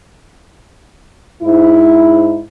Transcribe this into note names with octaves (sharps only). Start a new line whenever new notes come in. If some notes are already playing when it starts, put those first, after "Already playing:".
G#2 E4